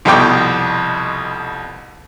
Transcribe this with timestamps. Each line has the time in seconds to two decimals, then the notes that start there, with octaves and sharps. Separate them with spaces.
0.05 C2 F2 B2 G5 D6